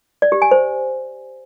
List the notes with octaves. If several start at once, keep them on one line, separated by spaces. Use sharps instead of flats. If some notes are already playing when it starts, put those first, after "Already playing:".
D5
G4
G#5
C5